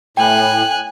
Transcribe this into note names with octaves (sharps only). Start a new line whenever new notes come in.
A2 G5 G#5 F#6